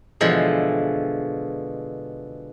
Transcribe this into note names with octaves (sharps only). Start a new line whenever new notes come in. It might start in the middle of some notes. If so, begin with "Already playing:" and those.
B2 D3 E3 F3 G#3